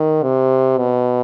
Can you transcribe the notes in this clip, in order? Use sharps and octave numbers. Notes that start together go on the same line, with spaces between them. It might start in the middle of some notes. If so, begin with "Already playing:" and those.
Already playing: D#3
C3
B2